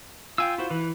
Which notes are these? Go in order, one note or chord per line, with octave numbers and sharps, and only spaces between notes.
F4 G5 G#5 E6
E4 F#4 C5
E3 B4